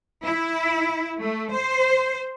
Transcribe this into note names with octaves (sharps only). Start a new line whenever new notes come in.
E4
A3
C5